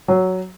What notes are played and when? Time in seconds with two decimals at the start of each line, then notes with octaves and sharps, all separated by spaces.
0.08 F#3